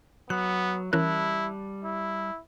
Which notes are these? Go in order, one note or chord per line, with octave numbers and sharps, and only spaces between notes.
F#3 B3 F#6
E3 G3 C#4 E4 A#4 A5 F#6
E4